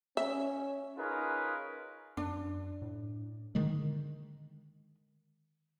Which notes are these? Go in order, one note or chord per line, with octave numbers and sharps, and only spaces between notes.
C#4 E5
C#4 D#4 F4 G#4 A#4 B4
F#2 D4
A2
D3 D#3 G#3